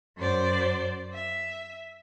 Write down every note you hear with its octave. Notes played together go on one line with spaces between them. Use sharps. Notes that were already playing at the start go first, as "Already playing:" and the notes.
F#2 C5 D5
E5